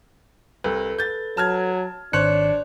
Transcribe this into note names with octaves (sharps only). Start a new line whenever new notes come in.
C2 A4 B4
G6 A6
F#3 A5 F6 G#6
G#1 D4 C5 C#5 F#6 C#7